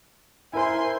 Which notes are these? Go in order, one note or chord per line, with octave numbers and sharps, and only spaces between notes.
E4 A#4 C5 G#5 C6